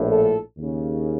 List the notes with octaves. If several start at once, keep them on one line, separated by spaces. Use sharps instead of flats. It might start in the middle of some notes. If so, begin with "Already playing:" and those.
Already playing: A#1 A2
A4
D#2 C#3